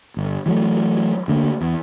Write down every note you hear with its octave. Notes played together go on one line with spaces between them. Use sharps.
G1
E3 F#3 A3
D2 D3 A#3
E2